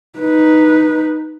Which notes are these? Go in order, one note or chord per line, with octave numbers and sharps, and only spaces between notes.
D#4 B4